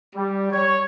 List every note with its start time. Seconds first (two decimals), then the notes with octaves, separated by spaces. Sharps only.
0.16 G3
0.52 C#5